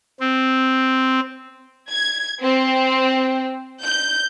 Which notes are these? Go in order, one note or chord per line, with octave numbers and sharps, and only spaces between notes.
C4
G#6
C4
G6